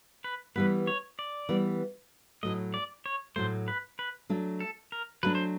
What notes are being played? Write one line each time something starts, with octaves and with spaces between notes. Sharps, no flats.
B4
E3 G3 B3 B4
C#5
D5
E3 G3 B3
A2 F#3 A3 D#5
D5
C#5
A2 F#3 A3 C5
B4
B4
F#3 A3 D4
A4
A#4
F#3 A3 D4 B4
C5